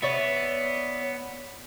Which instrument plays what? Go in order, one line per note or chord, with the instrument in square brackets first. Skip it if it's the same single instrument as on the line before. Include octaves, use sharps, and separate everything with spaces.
[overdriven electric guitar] B3 [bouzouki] C#5 D5 E5